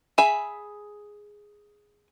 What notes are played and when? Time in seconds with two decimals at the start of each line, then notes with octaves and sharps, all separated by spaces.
0.18 G#4 E5 B5